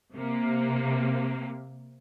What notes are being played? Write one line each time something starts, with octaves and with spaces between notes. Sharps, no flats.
C3 A#3